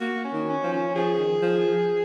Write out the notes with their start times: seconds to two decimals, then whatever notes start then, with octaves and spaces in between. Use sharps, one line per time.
0.01 A#3 F#4
0.24 C#4
0.33 D#3
0.49 C#4
0.64 F3
0.72 C#4
0.95 F3 G#4
1.19 D#3
1.42 F3
1.67 F3